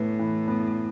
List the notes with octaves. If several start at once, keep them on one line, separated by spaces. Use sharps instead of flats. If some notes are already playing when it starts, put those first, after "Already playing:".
Already playing: A2 E3 B3 B4
E3
B3